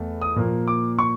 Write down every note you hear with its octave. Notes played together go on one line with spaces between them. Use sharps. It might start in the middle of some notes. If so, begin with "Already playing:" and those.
Already playing: E2 A3
D#6
A#2 F3 A#3
D6
C#6